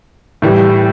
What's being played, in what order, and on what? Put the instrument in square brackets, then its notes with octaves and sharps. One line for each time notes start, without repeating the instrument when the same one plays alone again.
[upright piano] A2 E3 G3